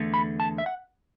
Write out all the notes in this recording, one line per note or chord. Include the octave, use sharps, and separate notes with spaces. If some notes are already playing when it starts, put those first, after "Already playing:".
Already playing: E2 D3 A3
B5
A5
E5
F#5